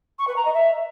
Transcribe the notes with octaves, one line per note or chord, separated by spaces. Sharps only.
C#6
B4
A#5
D#5
E5